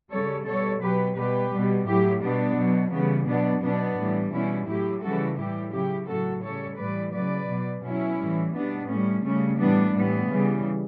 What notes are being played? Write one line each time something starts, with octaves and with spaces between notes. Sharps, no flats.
C#3 G3 A4 C#5
B2 G3 A4 C#5
B2 F#3 G4 B4
B2 G3 G4 B4
B2 G3
A2 F#3 E4 G4
B2 G3 B3 D4
B2 F#3
C#3 E3 G3 B3
B2 F#3 B3 D4
B2 F#3 B3 D4
A2 E3 G3
B2 G3 C#4 E4
A2 F#3 E4 G4
C#3 E3 G3 F#4 A4
A2 E3 G3 E4 G4
C#3 F#3 E4 G4
A2 F#3 F#4 A4
C#3 G3 A4 C#5
A2 E3 G3 B4 D5
C#3 F#3 B4 D5
B2 F#3
B2 F#3 C#4 E4
A2 E3 G3
B2 G3 B3 D4
A2 G3 A3 C#4
C#3 G3 A3 C#4
A2 E3 G3 B3 D4
A2 E3 G3 B3
C#3 E3 G3